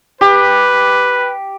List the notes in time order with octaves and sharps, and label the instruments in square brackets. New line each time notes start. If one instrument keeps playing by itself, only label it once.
[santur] G4 [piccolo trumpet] B4